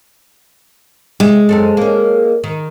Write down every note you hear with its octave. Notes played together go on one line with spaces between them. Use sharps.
C3 G#3 E5
F#2 C4 A4
A#3 C#4
D#3